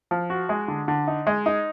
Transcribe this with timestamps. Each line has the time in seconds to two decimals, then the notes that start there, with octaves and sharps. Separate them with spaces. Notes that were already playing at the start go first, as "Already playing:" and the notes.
0.11 F3
0.30 F#4
0.49 G#3
0.68 D3
0.88 D3
1.07 D#4
1.27 G#3
1.46 D#4